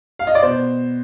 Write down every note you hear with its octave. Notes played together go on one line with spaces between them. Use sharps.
F5
D#5
D5
B2 C5